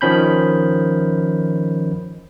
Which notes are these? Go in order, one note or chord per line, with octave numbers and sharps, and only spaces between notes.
D#3 F3 C#4 B5 G6